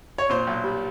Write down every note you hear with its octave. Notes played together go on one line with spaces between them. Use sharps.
C#5
A#2 C5
B1
G3